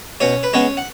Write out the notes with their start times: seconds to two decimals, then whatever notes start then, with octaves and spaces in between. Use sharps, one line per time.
0.20 B2 C#4 C#5
0.43 B4
0.53 G#3 B3 C#4 C#5
0.77 F#5